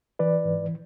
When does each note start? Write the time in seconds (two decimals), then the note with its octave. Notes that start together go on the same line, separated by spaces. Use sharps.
0.19 E3 B4 D5
0.45 G#2